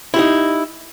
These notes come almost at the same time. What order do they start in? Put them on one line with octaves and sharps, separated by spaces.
E4 G4 D#4